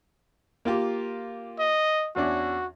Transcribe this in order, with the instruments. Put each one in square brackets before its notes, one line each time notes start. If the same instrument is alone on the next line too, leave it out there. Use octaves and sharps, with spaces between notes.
[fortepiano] A#3 F4 G4
[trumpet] D#5
[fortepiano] E2 C#4 D4 [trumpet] F#4